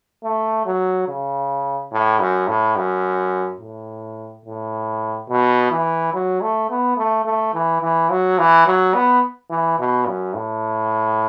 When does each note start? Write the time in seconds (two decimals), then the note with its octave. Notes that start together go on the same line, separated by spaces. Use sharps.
0.24 A3
0.66 F#3
1.08 C#3
1.92 A2
2.20 F#2
2.48 A2
2.76 F#2
3.60 A2
4.45 A2
5.29 B2
5.71 E3
6.14 F#3
6.41 A3
6.70 B3
6.98 A3
7.25 A3
7.54 E3
7.81 E3
8.10 F#3
8.39 E3
8.66 F#3
8.94 B3
9.50 E3
9.79 B2
10.06 F#2
10.34 A2